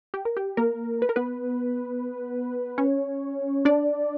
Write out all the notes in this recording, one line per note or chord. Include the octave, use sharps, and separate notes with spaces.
G4
A#4
G4
A#3 A#4
B4
A#4
B3 B4
C#4 C#5
D4 D5